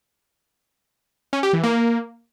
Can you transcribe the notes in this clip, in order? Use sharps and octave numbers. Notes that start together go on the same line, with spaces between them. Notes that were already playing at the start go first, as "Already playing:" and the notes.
C#4
G4
E3
A#3